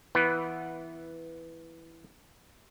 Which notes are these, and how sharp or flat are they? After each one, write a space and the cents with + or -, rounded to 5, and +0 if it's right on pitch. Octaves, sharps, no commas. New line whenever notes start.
E3 +0 B3 +0 B4 -5